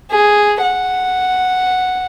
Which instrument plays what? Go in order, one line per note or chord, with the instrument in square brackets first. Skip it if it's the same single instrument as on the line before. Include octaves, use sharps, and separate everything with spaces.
[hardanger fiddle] G#4
F#5